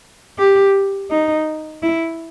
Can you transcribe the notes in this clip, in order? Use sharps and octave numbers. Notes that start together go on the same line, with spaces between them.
G4
D#4
E4